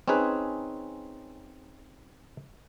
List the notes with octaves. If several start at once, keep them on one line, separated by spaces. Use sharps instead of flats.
C4 C#4 D#4 G#4 B4